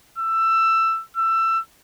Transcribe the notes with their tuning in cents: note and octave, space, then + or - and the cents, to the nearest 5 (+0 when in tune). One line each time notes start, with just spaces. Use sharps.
E6 +15
E6 +20